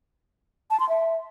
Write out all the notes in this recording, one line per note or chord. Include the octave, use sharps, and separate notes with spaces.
A5
C6
E5